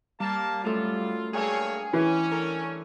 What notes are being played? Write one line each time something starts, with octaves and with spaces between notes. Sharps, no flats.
G3 A#3 A5
F#2 A3 F4 A4
G2 A3 A#3 G#4 C#5 G#5
E3 C#4
A4 A#4